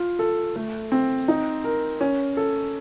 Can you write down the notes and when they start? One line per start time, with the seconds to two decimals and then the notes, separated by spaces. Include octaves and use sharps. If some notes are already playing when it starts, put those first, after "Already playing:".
Already playing: F4
0.19 A4
0.56 A3
0.92 C4
1.28 D#4
1.64 A#4
2.01 C#4
2.37 A4